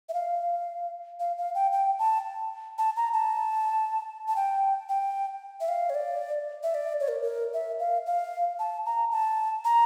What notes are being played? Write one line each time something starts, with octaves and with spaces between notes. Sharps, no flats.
E5
F5
F5
F5
G5
G5
A5
A5
A#5
A5
A5
G5
G5
E5
F5
C#5
D5
E5
D5
C#5
A#4
A#4
E5
F5
F5
A5
A#5
A5
A#5